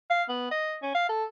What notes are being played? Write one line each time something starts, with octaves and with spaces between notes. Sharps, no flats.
F5
B3
D#5
C#4
F5
A4